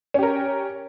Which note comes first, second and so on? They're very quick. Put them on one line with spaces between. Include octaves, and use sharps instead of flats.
C#4 G4 A#4